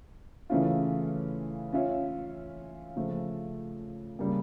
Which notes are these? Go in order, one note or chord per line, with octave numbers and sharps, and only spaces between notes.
C#3 E3 A3 C#4 F4
C#4 F4 C#5 E5
C#3 F3 A3
C#3 G3 A#3